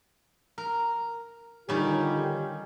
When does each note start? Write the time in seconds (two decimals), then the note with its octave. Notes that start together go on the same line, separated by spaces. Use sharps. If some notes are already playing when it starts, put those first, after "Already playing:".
0.58 A#4
1.69 D3 D#3 G3 C#4 F4 G4